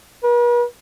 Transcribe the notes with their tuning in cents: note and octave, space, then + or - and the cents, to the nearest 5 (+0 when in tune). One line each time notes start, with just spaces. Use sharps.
B4 -45